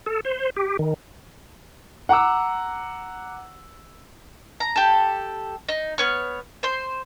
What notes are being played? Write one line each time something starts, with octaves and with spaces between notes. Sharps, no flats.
A4
C5
G4
D#3
F#5 A#5 D6 E6
A#5
G4 A4
D#4
B3 C#5 F6
C5 C6